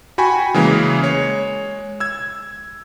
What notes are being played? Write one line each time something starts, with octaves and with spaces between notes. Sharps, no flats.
F#4 G5 G#5 B5 C#6
C#3 E3 G#3 A#3
G#3 C#5
E6 G#6